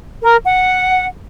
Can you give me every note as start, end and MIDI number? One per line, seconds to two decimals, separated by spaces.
0.22 0.36 70
0.44 1.05 78